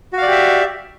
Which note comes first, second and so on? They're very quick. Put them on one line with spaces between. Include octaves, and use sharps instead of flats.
F#4 F5 D5 G4 E5